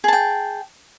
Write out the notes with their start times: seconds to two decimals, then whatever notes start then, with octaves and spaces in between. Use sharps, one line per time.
0.04 G#4
0.08 A5
0.13 G5